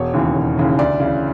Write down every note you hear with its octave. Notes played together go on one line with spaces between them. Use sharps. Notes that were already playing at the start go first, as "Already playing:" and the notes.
Already playing: E1 C#5
D#2 C#3 E3
E1
D#2 C#3 E3
D2 D5
C#3 E3